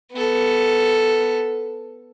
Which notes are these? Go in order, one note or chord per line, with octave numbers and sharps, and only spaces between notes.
B3 A4